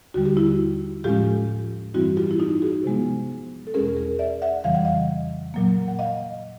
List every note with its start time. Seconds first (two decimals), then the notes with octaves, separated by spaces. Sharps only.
0.14 D#2 D3 G3 F#4
0.26 G4
0.37 E4 F#4
1.04 A2 F3 G#3 C#4 F4 G4
1.94 G2 E3 G3 C4 E4 F#4
2.17 F4 G4
2.31 E4
2.40 D#4 F4
2.62 F#4 G#4
2.84 C3 F3 G#3 B3
3.67 A4
3.74 E2 B2 G#3 C#4 G#4 A#4
3.96 G#4 A#4
4.19 D5 E5
4.42 E5 F#5
4.64 F2 C#3 E3 G3 F5
4.75 F#5
4.85 D#5 F5
5.54 A#2 F#3 A#3
5.88 F#5
5.99 D#5 F5